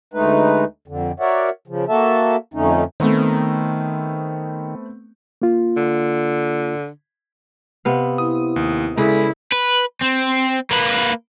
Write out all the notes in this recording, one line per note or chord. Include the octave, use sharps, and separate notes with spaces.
D2 G#3 A3 D#4 B4
F2 D3
F#4 A#4 C#5 D5 E5 F#5
C#3 F3
A#3 F#4 A4 E5 A5
F2 D3 A3 C#4 D#4
D#3 A3 B3 C4
A#3 F4
D3
C3 B3 F5
E4 D#6
D#2
C#3 G#3 E4 G#4 A4 B4 D5
B4
C4
A#3 B4